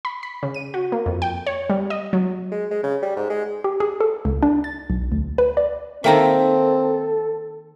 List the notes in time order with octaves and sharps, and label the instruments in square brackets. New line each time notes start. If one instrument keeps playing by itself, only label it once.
[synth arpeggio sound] B5
B5
C#3
D#7
F#4
A#3
F2
G5
C#5
G3
D#5
F#3
[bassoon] G#3
G#3
C#3
G3
G#2
G#3
[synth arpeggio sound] G4
G#4
A4
C#2
D4
A6
B1
D2
B4
D5
[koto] D#3 A#3 [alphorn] C4 [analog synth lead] A4 [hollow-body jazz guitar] E5 G5 A#5